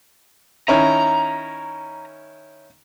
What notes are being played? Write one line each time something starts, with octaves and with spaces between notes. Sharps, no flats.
D#3 C#4 E4 A#5